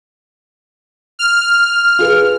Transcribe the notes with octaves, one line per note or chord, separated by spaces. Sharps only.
F6
F4 G#4 B4